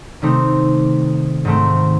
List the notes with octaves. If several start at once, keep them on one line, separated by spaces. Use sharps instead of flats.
C3 D#3 A3 C4 D#4
G#2 D#3 A3 C4